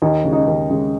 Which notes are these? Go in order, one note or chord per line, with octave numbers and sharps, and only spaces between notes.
D#2 D#4
C#3 G#3
D#4
D#2
C#3 G#3